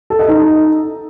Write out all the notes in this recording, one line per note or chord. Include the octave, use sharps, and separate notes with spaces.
A4
D#5
D#4